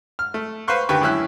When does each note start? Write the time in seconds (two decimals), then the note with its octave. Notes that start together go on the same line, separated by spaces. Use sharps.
0.19 F6
0.34 A3
0.68 B4 C5 F5 C6 C#6 F#6
0.89 D2 D#3 G4 B4 G5 C#6
1.01 F#2 A2 C#4 E4 F#6